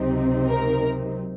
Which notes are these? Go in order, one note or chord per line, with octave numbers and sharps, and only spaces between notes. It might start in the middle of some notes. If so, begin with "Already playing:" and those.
Already playing: C#2 C3 F#3 C4 D#4
A#4